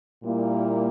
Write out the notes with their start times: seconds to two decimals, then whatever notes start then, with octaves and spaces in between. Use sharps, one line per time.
0.22 A#2 G3 A#3 E4